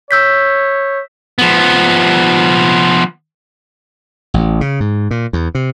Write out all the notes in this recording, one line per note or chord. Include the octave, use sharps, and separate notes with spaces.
C#5 E6 G6 B6
F3 B3
A1
C#3
G#2
A#2
E2
C3